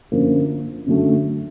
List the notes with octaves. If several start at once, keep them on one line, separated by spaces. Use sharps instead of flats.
F#2 D3 F3 A#3
F#2 D3 F#3 A3